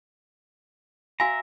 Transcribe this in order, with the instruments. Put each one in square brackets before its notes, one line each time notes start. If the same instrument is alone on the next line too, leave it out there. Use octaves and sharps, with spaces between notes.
[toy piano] F#4 F5 G#5 [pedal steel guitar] E5 A#5